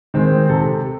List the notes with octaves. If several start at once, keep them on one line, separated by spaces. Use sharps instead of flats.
D#3 G#3 C4
C3 A4